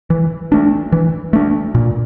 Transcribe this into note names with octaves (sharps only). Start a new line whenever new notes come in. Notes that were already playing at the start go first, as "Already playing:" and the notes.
E3
A3 D4
E3
A3 D4
A#2